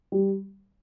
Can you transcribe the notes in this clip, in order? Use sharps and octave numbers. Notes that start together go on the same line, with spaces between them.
G3